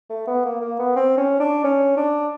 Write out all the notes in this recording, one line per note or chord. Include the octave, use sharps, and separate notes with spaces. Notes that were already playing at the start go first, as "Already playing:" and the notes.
A3
B3
A#3
A#3
B3
C4
C#4
D4
C#4
D4